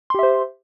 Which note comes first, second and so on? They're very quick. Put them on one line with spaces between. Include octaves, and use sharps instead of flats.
C6 G4 E5 C5